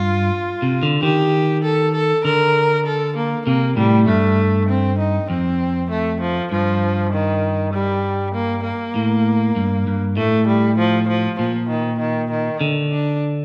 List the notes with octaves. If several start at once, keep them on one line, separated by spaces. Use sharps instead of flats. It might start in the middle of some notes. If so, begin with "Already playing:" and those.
Already playing: G2 F4
C3
D3
D#3 G4
A4
A4
D3 A#4
A4
A#3
C3 A#3
A2 G3
G2 A3
C4
D#4
F2 C4
A3
F3
G2 F3
D#3
G3
A#3
A#3
A2
G2
G2
A2 A3
G3
F3
F3
A#2 F3
D#3
D#3
D#3
D3
D4